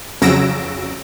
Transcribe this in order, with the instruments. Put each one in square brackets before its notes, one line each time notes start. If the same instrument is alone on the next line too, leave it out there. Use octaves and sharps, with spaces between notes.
[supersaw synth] F2 C#3 F#3 E6 A#6 D7